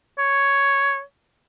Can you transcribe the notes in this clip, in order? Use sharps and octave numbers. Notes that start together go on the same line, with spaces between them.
C#5